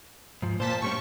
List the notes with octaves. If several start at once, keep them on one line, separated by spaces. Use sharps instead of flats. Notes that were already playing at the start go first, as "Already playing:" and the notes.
G#2 F3
A#2 C5 A5 B6
A2 G3 C#4 C#6